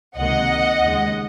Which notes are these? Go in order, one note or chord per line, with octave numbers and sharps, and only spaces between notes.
C#2 C3 D#3 A#3 D#5 F#5
D#2 C#3 G#3